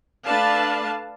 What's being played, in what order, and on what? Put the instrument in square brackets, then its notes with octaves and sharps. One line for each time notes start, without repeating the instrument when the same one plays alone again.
[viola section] A3 D4 B4 D5 F5 A5